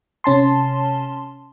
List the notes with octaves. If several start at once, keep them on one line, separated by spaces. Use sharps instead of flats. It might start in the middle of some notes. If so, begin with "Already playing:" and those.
C3 C#4 A5 C6